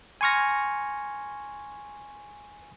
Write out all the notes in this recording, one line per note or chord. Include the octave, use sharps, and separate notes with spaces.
G#5 C6 C#6 F6 A#6